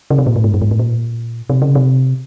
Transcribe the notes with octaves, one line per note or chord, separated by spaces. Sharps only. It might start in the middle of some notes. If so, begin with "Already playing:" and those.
C#3
C3
A#2
A2
G#2
G2
G#2
A2
A#2
C3
C#3
C3